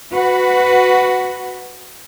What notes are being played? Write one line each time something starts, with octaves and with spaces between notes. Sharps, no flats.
F#4 B4